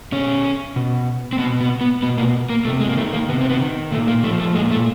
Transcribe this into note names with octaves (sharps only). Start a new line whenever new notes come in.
B2 C#4
B2
C4
B2 B3
B3
B3
B2 B3
A#3
A#3
C3 A3
G#3
A#3
D#3 A3
A#3
C3 B3
C4
B3
D#3
A#2 A3
A#3
F3 A3
A3
A#2 G#3
A3